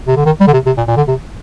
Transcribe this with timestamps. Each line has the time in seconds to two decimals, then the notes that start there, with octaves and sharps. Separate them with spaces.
0.07 C3
0.16 D3
0.26 D#3
0.40 G3
0.47 D3
0.53 C3
0.66 C3
0.77 A#2
0.88 A#2
0.97 D3
1.08 C3